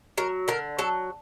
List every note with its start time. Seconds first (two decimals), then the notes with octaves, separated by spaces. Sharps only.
0.18 F#3 A#4
0.48 D3 A#4
0.79 F#3 A4